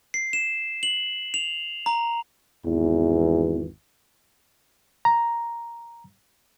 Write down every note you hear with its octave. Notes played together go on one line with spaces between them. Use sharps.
C7
E7
F#7
F7
A#5
G#1 E2
A#5